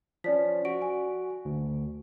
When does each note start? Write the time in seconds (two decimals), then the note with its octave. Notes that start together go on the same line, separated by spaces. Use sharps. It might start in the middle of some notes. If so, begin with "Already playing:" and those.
0.24 F3 C#4 D5 B6
0.65 F#4 D7
0.82 G#5
1.45 D2